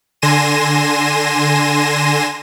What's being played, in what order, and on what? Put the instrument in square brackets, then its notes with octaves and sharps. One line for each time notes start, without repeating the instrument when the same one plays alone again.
[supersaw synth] D3 G#5 C6 A#6 D#7 E7